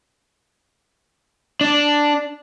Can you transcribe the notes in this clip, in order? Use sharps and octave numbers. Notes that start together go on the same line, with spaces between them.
D4